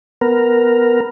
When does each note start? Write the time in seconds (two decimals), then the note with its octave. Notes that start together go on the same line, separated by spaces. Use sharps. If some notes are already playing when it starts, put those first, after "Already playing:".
0.21 B3 A#4